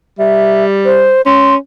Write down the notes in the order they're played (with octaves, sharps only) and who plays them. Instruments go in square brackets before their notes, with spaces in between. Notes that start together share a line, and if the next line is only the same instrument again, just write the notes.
[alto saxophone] G3 [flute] E5
[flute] C5
[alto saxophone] C#4 [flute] C6